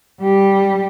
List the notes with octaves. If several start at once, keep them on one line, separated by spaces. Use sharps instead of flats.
G3 G4